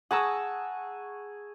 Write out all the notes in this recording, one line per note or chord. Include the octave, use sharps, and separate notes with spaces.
G#4 F#5 A5 A#5 C#6 E6